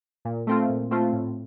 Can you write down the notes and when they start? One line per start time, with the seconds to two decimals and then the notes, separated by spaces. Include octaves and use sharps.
0.25 A#2
0.47 A3 C4 F4
0.69 A#2
0.91 A3 C4 F4
1.13 A2